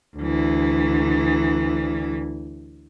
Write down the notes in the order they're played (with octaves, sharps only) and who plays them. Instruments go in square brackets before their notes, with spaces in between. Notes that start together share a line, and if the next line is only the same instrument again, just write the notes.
[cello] D2 E3